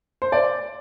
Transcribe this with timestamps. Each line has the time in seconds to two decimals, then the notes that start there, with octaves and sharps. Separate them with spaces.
0.22 C5
0.32 D5